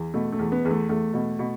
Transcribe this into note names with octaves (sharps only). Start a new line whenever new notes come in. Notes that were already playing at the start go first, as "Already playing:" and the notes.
Already playing: E2
B2 A3
A3
E2
B3
E2
A3
E2 A3
B2
B2